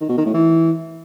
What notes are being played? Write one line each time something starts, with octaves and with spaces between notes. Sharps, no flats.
D#3
B2
D#3
A2
E3